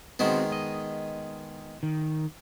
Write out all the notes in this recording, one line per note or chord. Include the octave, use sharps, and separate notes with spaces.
D#3 G#3 B3 C4 F#4 C5
D#5
D#3